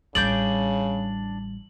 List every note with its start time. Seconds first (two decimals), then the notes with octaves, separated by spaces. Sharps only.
0.15 A1 C#3 G3 D4 D6 G6 F#7